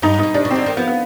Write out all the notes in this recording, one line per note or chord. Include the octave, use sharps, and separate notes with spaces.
G2 D#4
G#2
B2 D#4
C3 D4
B2
C4
D3
D#3
F3 B3
B3